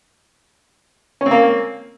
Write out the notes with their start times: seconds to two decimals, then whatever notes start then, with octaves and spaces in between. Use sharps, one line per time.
1.21 C#4
1.26 C4
1.31 A#3